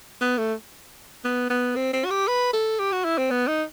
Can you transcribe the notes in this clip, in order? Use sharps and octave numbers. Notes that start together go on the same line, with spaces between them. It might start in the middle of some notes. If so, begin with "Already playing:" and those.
B3
A3
B3
B3
C4
C4
F#4
G4
B4
A4
G4
F#4
E4
C4
B3
D#4